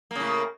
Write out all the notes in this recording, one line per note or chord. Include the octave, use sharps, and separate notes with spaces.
A2 C#3 A#3